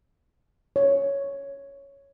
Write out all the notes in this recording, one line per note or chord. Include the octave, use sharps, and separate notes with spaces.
C#5